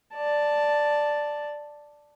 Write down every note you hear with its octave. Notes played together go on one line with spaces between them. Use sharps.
D5 A5